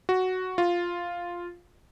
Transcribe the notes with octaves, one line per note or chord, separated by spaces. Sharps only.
F#4
F4